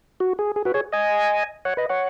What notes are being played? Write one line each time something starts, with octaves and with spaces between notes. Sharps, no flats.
F#4
G#4
G#4
F#4 B4
G#4 C#5
D#5 G#5
C#5 F#5
B4 D#5
C#5 F#5